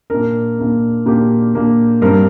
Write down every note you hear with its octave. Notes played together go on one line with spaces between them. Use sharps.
A#2 A#3 D4 A#4
A#2 A#3 D4
A#2 A#3 D4 G4
A#2 A#3 D4
G2 G3 C4 A#4